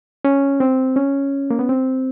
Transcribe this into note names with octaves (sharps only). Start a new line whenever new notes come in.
C#4
C4
C#4
A#3
B3
C4